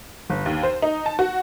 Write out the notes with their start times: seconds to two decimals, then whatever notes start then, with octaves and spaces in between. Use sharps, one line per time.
0.30 G1
0.46 D#2
0.63 C5
0.82 D#4
1.06 A5
1.19 F#4